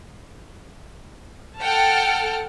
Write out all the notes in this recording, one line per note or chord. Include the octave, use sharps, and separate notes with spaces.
A4 F#5 G5 A5 F6